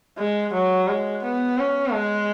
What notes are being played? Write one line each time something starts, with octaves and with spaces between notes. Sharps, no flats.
G#3
F#3
G#3
B3
C#4
G#3